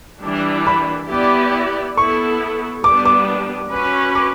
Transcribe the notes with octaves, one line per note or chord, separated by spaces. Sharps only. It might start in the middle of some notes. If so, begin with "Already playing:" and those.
E3 G3 D4
B5
B3 E4 G4 D5
B3 E4 A4 C#6
G3 B3 D4 D6
D6
C#4 F#4 B4
D6